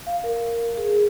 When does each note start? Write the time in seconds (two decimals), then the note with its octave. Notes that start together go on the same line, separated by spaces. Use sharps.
0.07 F5
0.24 A#4
0.77 G#4